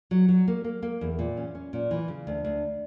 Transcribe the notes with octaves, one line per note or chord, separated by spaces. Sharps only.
F#3
F#3
A#3
A#3
A#3
E2
A#2
C#4
C#4
A#2
E3
C#3
D2
D2